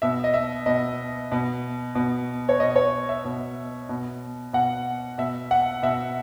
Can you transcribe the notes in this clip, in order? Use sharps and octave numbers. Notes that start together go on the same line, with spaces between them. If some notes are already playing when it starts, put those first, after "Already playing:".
B2 E5
D#5
E5
B2 D#5
B2
B2
C#5
B2 D#5
C#5
E5
B2
B2
B2 F#5
B2 E5
F#5
B2 E5